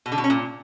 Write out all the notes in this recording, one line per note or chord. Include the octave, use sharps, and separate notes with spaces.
B2
D3
B2
C#4
A#2